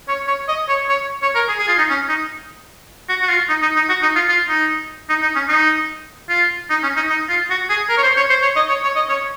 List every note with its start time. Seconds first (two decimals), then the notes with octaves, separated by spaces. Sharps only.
0.08 C#5
0.28 C#5
0.48 D#5
0.69 C#5
0.89 C#5
1.22 C#5
1.35 A#4
1.48 G#4
1.59 G#4
1.68 F4
1.78 D#4
1.89 C#4
2.09 D#4
3.09 F#4
3.22 F#4
3.29 F4
3.49 D#4
3.62 D#4
3.76 D#4
3.89 F#4
4.02 D#4
4.16 F4
4.29 F4
4.49 D#4
5.10 D#4
5.22 D#4
5.36 C#4
5.49 D#4
6.29 F4
6.70 D#4
6.83 C#4
6.96 D#4
7.10 D#4
7.29 F4
7.50 F#4
7.69 G#4
7.89 A#4
7.98 C#5
8.03 C5
8.17 C#5
8.30 C5
8.42 C#5
8.56 D#5
8.69 C#5
8.83 C#5
8.96 D#5
9.09 C#5